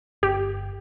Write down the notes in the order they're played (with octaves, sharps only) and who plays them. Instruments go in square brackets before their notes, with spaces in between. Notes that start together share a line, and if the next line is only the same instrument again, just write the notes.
[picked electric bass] G1 [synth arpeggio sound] G4